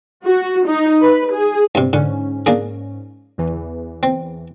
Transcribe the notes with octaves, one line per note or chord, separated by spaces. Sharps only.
F#4
D#4
B4
G#4
G2 C3
G#2 D3 C#4
A#3 D4 G#4
E2 E3
C4